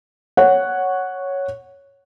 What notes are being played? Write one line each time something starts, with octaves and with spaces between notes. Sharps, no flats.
C#5 F#5